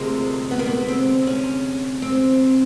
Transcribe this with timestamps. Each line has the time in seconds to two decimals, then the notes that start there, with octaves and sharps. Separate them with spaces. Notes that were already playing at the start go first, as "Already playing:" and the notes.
Already playing: D2 C3 F3 G#3 A#3
0.51 B3
0.59 A#3
0.66 B3
0.88 C4
1.27 C#4
2.02 C4